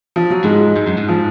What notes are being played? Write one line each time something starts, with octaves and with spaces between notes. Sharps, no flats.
F3
F#3
G#2 G#3
G#2
F#2
G#2
F3